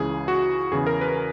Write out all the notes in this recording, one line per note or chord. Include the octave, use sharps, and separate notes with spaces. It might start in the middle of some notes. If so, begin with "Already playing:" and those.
Already playing: C#2 C#3 E3 G#4
F#4
E2 C#3 E3 G#4
A#4
B4